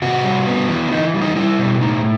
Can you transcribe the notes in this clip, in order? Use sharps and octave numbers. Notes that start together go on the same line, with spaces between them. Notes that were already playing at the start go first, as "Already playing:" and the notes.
C3 F#4
G3
B3
E3
E4
E3 D#4
G3
D#4
G3 E4
B2
A2 D#4